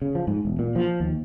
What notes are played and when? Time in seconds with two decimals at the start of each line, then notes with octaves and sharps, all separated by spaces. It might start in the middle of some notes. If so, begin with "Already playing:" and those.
0.02 C#3
0.15 F3
0.27 G#2
0.45 E1
0.59 A#2
0.76 F3
1.00 D#2